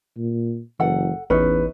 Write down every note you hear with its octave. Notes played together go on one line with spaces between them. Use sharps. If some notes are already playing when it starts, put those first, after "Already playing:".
A#2
F#1 E3 A4 F#5
A1 E2 C#4 D#4 B4